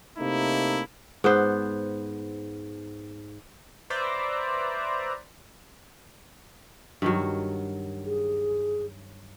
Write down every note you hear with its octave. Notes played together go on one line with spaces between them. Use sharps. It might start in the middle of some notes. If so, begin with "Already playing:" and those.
C3 A3 A#3 D#4 E4
G#2 B3 C5
B4 C5 D5 E5 A#5
G2 D#3 F#3
G#4